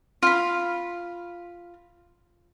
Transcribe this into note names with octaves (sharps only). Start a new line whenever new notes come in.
F4 B5